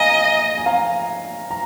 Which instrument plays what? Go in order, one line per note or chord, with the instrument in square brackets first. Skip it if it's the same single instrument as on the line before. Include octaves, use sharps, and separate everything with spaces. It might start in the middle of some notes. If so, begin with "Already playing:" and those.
Already playing: [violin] D#5 [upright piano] F5 G#5 A#5
[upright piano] G#5
F5 A#5
A#5